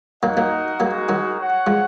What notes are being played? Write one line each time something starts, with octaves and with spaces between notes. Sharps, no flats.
F#3 A#3 D#4 F#4 A#4 D#5 F#5
F#3 A#3
F#3 G#3 A#3 D#4 F#4 A#4
D#3 F#3
F#4 C#5 F#5
F3 G#3